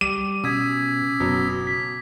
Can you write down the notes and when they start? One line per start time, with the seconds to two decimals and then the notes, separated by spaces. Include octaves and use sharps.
0.01 G3 D6 D#7
0.44 B2 C#4 D#6 E6 G#6 B6
1.20 F#1 B2 F#3
1.67 B6